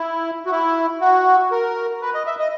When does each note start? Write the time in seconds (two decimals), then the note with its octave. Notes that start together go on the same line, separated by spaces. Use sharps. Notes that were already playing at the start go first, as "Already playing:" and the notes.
Already playing: E4
0.46 F#4
0.51 E4
1.01 F#4
1.52 A#4
2.02 B4
2.14 D#5
2.27 E5
2.39 D#5